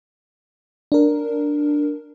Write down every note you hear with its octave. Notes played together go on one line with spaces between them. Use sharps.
D4 A#4